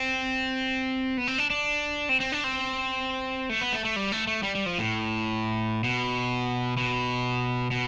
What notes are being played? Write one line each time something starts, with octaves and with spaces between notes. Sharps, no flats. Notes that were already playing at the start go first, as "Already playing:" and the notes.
Already playing: C4
B3
C4
D4
D4
C4
C4
D4
C4
A3
B3
A3
A3
G3
A3
A3
G3
G3
F3
A2
B2
B2
B2